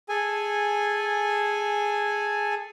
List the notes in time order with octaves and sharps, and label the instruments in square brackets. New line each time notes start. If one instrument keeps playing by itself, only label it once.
[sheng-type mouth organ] G#4 A4 G#5